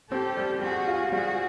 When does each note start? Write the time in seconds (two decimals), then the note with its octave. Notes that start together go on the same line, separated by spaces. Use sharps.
0.11 C4 G4 A4
0.37 G3
0.61 G3 F#4 G#4
0.88 F4
1.12 G3 F#4 G#4